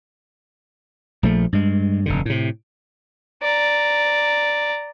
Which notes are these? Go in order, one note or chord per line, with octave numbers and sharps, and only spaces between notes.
A#1 F3 A3
G2 G#3
F1 G2 D3
A2 C3
D5 A#5